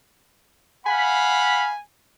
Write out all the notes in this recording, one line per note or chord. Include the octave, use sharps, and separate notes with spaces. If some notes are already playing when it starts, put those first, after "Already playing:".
F5 F#5 G#5 B5